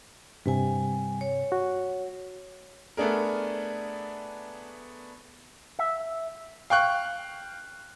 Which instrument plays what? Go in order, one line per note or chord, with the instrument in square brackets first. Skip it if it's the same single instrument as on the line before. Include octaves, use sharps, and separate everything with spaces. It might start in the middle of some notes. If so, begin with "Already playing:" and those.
[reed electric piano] G2 C3 [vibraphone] G3 G#5
[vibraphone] C#5
[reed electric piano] F#4
[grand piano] A3 B3 D4 G#4 A#4
[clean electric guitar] E5
[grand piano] F5 G5 C#6 F#6